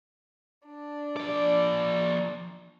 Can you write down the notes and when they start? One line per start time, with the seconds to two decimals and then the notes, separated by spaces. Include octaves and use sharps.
0.67 D4
1.17 F3 D5